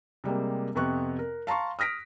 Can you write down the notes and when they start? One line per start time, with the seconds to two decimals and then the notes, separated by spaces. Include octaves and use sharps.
0.24 C3 G3 G#3 A#3
0.75 F2 C3 B3 C#6 F#6
1.19 A#4
1.47 F5 A5 A#5 C6 C#6
1.79 D#6 F6 A#6 B6 D7